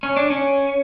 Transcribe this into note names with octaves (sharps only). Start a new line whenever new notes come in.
C#4
D4
C#4